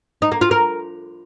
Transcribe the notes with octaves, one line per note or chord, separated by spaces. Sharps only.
D#4
A#3
F4
A#4